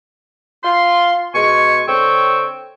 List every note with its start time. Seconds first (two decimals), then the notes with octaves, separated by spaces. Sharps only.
0.64 F4 C6
1.34 B2 G#3 G#5 C#6
1.88 D3 C4 C#5 G5 C#6 E6